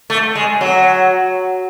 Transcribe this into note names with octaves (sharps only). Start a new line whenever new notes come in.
A3
G#3
F#3